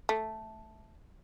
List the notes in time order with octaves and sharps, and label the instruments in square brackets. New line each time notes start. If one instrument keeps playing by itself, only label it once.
[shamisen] A3